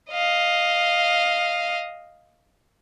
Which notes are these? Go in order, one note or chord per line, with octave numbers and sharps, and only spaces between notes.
D#5 F5